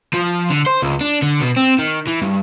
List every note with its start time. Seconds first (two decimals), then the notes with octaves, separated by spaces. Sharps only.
0.14 F3
0.50 D3
0.67 C5
0.82 C#2
1.01 D4
1.22 D3
1.41 B2
1.56 C4
1.79 D#3
2.07 E3
2.22 G2